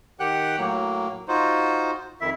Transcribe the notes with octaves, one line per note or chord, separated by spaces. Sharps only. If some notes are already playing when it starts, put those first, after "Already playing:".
D#3 G4 F#5 G5 F#6
A2 F#3 A#3
D#4 F4 F#4 C5
F2 D#3 E4 E5